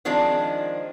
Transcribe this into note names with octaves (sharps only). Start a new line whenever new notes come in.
D#3 F3 G#3 C4 D4